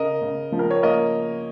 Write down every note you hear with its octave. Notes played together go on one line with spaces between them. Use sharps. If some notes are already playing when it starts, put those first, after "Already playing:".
Already playing: C#3 A#4 D#5
C#3
F3
A#4
C#5
A#3 A#4 D#5